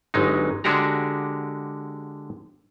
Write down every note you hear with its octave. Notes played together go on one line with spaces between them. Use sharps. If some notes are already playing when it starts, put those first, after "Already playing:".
G1 F#3 G#3 D#4
D3 G#3 D4 F#4 G4 A#5